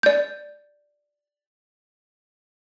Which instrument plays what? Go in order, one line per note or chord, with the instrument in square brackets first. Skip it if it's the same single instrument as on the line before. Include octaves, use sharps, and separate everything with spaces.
[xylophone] D5 G6